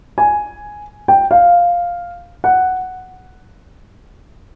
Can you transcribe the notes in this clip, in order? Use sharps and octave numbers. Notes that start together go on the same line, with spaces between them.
G#5
G5
F5
F#5